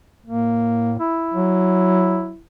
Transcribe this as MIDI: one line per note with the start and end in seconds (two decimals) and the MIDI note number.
0.26 0.94 45
0.26 0.95 58
0.99 2.41 64
1.34 2.31 54